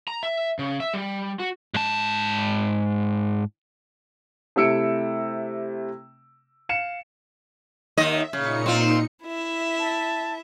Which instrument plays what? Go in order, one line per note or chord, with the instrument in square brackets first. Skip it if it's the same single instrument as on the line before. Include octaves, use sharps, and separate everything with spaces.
[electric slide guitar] A#5
E5
C#3
E5
G3
F#4
[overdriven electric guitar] G#2 A5
[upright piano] C3 A3 E4 E6 C#7 D7
F5 C#7 E7
[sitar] D#2 D#3 D#5 [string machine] E5
[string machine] A#2 D#4 C#7 [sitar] C#3
[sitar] C4 F4
[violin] E4 E5
[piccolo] A5